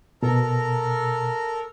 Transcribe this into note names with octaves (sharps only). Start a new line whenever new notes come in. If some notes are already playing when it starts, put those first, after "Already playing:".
B2 A4 A#4 A#5